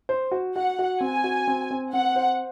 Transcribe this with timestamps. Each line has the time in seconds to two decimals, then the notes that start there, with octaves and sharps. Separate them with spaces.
0.09 C5
0.31 F#4
0.55 F#4 F#5
0.79 F#4
1.01 C4 G#5
1.24 F#4
1.47 C4
1.71 C4
1.93 C4 F#5
2.16 C5